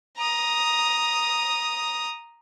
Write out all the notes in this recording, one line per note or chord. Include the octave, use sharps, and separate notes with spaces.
A#5 D#6